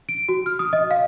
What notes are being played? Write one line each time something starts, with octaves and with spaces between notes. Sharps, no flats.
D7
F#4
F6
D#6
D#5
F5